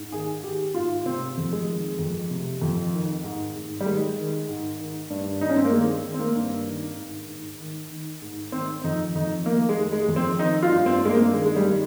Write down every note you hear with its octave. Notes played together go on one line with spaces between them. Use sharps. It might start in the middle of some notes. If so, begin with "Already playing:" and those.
Already playing: G#2
D#3 G#4
D#3 G4
G#2 F4
C3 C4
F2
G#3
D#3
F2
C3
F2
D#3
G#2
G#2
G3
D#3 G#3
D#3
G#2
D#3
G2
G2 D#4
C#4
C4
A#3
D#3 G#3
D#3
C4
A#3
G2
D#3
G#2
G#2
D#3
D#3
G#2
D#3 C4
F2 D#4
F2 D#4
D#3 A#3
G#3
D#3
G#3
F2
C4
D#3 D#4
F4
G2
C4
G2 G#3
A#3
D#3 G#3
G#3
G3
D#3